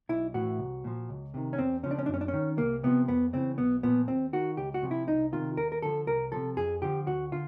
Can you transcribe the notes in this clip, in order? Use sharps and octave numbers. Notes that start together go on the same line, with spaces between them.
B1 E4
A2 E3 F#4
C2
A#2 F3
C#2
C3 D#3
C#4
E2 C4
C#3 F3 C#4
D4
C#4
F#2 D4
C#4
D4
C#4
D#3
C2 A#3
C3 F3 B3
F2 B3
C#3 E3 C4
B1 B3
A#2 F3 B3
D#2 C4
D#3 F#4
C#2 G4
F#4
C3 F3
E4
C2 D#4
C3 D#3 F4
D#2 A#4
A#4
D3 F3 A4
C2 A#4
C3 F3 A4
F2 G#4
D3 F3 G4
D2 F#4
D3 F4